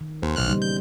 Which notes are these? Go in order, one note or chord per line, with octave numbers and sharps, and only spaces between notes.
D#3
D#2 C5
B1 A#2 E3 B3 F6 F#6
C#3 G3 D#4
G6